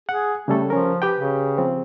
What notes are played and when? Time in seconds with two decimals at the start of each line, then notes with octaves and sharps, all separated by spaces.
0.09 G#4 F#5
0.48 C#3 G3 A3 A4
0.70 F3 C#4 A#4
1.02 G4 B4 G5
1.18 C#3
1.58 F3 C4